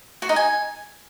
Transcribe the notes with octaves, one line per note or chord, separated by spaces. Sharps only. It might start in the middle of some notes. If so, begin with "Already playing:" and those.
F#4
D#4
G#5